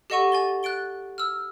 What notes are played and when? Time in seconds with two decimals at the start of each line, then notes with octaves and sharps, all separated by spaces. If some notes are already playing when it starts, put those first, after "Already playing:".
0.10 G4 A4 D#5 F#5 C#6 D#7
0.32 G#5 A6 G7
0.63 F#6 A6 D7 G7
1.18 E6 F6